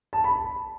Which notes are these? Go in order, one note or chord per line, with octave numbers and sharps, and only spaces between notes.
A5
B5